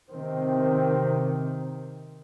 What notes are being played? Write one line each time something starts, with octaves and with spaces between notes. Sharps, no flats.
C3 D#3 C4